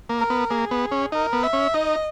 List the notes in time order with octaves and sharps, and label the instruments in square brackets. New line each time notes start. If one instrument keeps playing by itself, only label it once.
[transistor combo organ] A#3
[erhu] A#4
[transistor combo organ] B3
[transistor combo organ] A#3 [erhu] G#4
[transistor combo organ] B3
C#4
[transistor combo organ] D#4 [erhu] A#4
[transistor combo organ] B3
[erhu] E5
[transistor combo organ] C#4
[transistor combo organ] D#4 [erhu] D#5